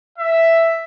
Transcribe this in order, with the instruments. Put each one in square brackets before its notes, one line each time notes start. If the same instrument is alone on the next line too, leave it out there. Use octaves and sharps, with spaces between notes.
[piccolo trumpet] E5